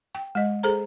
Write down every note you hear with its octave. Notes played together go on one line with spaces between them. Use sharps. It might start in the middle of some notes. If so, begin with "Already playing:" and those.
G5
G#3 D#5
G#4 A4 C5 A#5